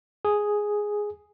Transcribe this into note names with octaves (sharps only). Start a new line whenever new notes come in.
G#4